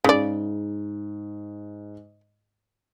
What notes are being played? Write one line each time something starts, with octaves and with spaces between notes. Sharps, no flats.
G#2 C#3 D5